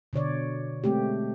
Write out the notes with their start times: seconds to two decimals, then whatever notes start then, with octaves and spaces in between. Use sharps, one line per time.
0.13 B2 D3 C#5 D5
0.84 G#3 A3 C4 G4